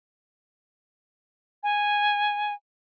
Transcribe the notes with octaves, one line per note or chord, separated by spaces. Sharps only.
G#5